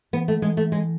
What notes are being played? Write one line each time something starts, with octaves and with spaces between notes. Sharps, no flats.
E3 B3
A3
E3 G#3
A3
G#3